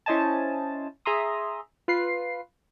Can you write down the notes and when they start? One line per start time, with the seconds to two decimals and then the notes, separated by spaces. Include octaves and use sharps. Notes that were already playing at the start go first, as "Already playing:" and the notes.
0.06 C#4 E4 C5 D#5 G#5 A5
1.05 G#4 E5 A#5 C6 D#6
1.88 F4 B4 C7